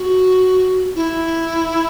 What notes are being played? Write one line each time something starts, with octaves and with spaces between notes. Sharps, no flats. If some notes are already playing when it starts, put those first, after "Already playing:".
Already playing: F#4
E4